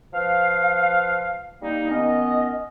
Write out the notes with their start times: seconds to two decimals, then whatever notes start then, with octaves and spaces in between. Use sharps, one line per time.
0.13 F3 B4 F5
1.62 G3 A#3 D#4
1.90 D#3 B3 C#4 D#5